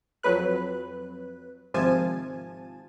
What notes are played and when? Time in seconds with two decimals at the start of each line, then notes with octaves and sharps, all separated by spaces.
0.23 F2 F#3 B4 F#6
1.74 G#1 C3 F3 G#5 A5 D#7